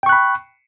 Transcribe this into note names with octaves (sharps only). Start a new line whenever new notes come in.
G5 B5 C#6 F#6